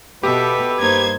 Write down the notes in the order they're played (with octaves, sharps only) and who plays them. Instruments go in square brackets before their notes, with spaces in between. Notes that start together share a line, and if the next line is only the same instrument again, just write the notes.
[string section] B2 [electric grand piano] G4 [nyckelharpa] A4 E5 [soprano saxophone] B4
[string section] G2 C5 G#6 [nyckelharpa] A#3 D#4